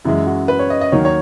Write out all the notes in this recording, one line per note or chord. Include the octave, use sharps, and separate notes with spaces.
F#2 E3 G#3 E4
F#4
B4
C#5
D#5
D#5
D#2 D#3 F#3 A#3 C#5
C#5